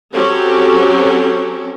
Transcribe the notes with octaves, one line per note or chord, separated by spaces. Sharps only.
F#3 C4 C#4 G4 A4